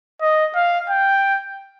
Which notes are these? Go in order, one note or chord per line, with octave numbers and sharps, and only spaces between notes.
D#5
F5
G5